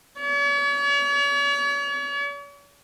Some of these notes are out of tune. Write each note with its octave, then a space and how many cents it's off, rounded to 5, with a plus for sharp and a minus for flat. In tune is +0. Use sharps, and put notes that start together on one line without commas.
C#5 +45